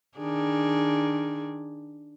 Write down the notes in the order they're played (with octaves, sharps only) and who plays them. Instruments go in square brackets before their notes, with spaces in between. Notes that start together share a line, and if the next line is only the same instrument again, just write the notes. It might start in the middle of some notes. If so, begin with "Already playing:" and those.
[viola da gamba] D#3 D4 G#4